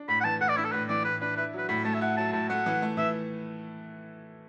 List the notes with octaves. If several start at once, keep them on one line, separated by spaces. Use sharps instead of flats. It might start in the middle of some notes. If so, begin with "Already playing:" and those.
Already playing: D4
A2 B5
F#5
E3 A5
A2 F#5
D5
D4 E4
A4
A2 B4
E3 D5
A2 B4
D4 B4
E4 B4
F#3
B4
A2 B5
A3 A5
E5
E4 F#5
F#3 A5
A2 A5
A3 F#5
E3
A3
E3 E5